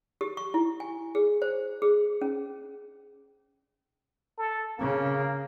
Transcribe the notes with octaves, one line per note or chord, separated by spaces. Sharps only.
G4
C#6
E4
G#5
G#4
C5
G#4
C#4
A4
C#3 A#3